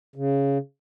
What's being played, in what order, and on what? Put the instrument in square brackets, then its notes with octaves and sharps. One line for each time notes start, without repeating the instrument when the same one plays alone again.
[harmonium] C#3